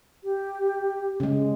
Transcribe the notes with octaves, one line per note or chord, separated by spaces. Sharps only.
G4
C#3 G#3